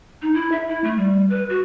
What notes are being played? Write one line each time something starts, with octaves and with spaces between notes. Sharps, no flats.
D#4
E4
E5
E4
A3
G3
B4
F#4